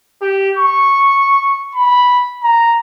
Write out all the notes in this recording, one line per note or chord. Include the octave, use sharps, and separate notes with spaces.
G4
C#6
B5
A#5